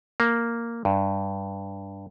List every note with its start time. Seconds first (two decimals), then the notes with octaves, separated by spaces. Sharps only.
0.20 A#3
0.85 G2